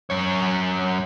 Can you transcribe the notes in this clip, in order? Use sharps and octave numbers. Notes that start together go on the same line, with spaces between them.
F#2 C#5